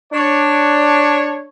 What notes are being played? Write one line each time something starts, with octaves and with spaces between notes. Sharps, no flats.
D4 C#5